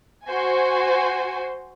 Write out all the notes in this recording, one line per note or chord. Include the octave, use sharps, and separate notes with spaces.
F#4 C5 G#5